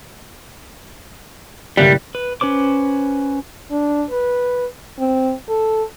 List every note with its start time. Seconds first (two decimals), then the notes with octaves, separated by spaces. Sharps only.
1.77 F#1 A2 G3 F#6
2.15 B4
2.41 C#4 B4 C5 D6
3.71 D4
4.10 B4
4.99 C4
5.49 A4